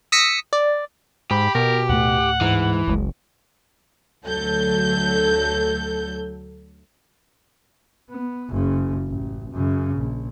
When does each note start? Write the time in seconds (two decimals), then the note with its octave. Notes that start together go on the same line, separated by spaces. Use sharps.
0.12 D#6 E6 A#6 B6 C#7
0.53 D5
1.31 G#2 G4 B5
1.55 B2 A#4
1.89 D2 A2 A3 F#5
2.41 G#2 E3
2.88 F#1 C#2 G#3
4.26 D2 F#3 A4 G6
8.10 B3
8.50 F#1 C#3
9.08 A1
9.51 F#2 C#3
9.97 A#1